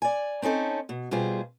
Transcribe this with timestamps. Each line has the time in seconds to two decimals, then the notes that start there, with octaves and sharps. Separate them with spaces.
0.02 D5 G#5
0.42 C4 C#4 D#4 A4 C#5
0.89 B2
1.11 B2 G3 F4 G#4 C5